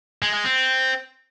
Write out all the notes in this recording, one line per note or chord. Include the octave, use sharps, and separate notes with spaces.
G#3
G#3
C4